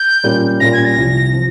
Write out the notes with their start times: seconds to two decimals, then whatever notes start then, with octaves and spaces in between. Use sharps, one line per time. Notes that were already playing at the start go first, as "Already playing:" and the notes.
Already playing: G6
0.24 A#2 G3 C#4 F4 A#4
0.60 A#2 G3 C#4 F4 A#4 A#6
0.73 G#6
0.84 A#6
0.97 C2 C3 F3
1.34 C3 F3